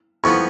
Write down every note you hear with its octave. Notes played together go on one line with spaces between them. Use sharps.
F2 F3 B3 C#6